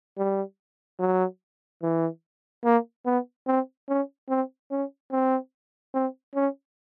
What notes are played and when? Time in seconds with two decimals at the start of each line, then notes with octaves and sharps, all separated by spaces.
0.17 G3
1.00 F#3
1.82 E3
2.65 A#3
3.06 B3
3.47 C4
3.88 C#4
4.29 C4
4.71 C#4
5.12 C4
5.94 C4
6.35 C#4